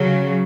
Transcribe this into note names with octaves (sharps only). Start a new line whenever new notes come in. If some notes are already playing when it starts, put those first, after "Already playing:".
Already playing: C#3 F#3